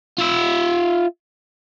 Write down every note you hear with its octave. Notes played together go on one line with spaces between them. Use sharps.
F4 E5